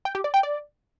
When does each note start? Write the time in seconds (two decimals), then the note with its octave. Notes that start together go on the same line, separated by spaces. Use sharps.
0.05 G5
0.15 G4
0.24 D5
0.34 G5
0.43 D5